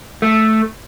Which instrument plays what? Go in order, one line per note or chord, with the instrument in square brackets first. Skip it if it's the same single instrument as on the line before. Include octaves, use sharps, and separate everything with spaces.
[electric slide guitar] A3